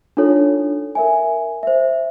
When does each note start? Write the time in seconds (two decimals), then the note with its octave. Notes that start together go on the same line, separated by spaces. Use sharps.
0.17 D4 D#4 F4 A4 C#5
0.95 A#4 E5 G#5
1.63 C5 E5